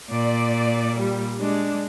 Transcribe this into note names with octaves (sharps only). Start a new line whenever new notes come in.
A#2 D5
G3
G#3 D4